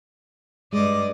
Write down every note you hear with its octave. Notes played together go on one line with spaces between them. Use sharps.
G2 G#3 D5 D#5